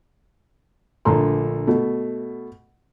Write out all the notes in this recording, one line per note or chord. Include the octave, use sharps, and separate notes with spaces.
A#1 D3 A3 A4 A#5 C6
B2 A3